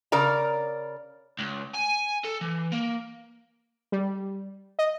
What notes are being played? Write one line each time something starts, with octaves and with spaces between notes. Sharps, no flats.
C#3 A#4 D5 A#5
C#2
G#5
A4
E3
A#3
G3
D#5